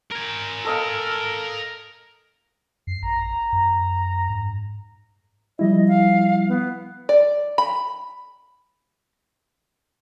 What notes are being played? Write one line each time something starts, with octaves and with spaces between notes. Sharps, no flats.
A#4 G#5
A4 D#5 F5
F#2 C7
A1 A#5
F#2
G#2
F3 G3 E4 D#5
F5
B3
D5
B5